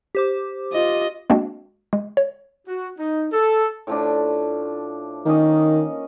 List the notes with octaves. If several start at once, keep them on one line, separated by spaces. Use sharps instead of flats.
G4 C5 D6
F4 D#5
G#3 A#3 C4 D4 F#4
G#3
C#5
F#4
D#4
A4
A2 F3 D4
D#3 A#3 C#4 D#5